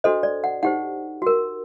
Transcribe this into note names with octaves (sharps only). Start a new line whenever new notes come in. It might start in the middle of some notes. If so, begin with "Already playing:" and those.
D4 F#4 A4 C5 D#5
D5
F#5
D#4 G4 C5 F#5
F#4 A#4